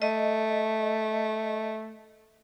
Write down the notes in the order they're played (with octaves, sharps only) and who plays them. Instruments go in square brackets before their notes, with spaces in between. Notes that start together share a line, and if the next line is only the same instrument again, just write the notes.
[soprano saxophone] A3 [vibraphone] D#5